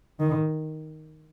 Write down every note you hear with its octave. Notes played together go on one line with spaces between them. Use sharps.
D#3